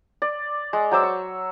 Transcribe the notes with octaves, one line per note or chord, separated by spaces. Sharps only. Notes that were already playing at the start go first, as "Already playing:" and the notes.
D5
G#3
F#3 C5 D6 E6
C#6